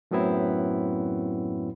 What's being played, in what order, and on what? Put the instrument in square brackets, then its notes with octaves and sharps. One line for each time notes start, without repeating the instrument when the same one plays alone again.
[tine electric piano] F#2 A2 F#3 B3 C4 E4